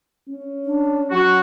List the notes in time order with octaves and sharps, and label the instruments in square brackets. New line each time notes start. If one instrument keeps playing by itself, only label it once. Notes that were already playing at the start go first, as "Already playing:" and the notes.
[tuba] C#4
[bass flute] D4
[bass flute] F#3 [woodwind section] F#4